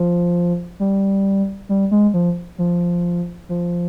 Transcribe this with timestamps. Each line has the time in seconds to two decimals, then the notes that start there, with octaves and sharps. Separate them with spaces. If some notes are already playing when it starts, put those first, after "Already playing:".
Already playing: F3
0.80 G3
1.69 G3
1.91 G#3
2.14 F3
2.58 F3
3.49 F3